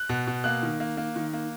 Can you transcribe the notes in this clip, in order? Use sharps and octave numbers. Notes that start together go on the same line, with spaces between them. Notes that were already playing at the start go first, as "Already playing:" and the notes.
Already playing: F#6
B2
B2
A#3 F#6
D#3
A#3
A#3
D#3
A#3